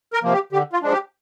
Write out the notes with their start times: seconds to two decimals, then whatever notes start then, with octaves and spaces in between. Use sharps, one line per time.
0.13 A#4
0.23 C3 F3 A#3
0.33 G4
0.52 D3 G4
0.73 F4
0.82 F3 G#3 D4
0.92 G4